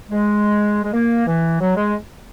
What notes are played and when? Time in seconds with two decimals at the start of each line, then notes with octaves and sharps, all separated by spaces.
0.10 G#3
0.83 G#3
0.93 A#3
1.27 E3
1.60 F#3
1.76 G#3